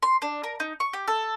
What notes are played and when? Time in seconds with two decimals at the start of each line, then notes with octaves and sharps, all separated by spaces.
0.03 C6
0.22 D4
0.44 A#4
0.60 D#4
0.80 C#6
0.93 G4
1.08 A4